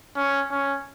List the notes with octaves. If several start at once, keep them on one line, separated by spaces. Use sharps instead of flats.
C#4
C#4